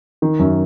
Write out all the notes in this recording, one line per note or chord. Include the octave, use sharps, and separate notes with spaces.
D#3
F#2